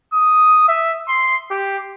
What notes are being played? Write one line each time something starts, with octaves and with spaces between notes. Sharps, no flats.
D#6
E5
C6
G4